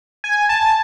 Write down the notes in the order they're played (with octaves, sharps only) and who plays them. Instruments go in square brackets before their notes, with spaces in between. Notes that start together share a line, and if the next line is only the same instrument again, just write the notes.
[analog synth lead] G#5
A5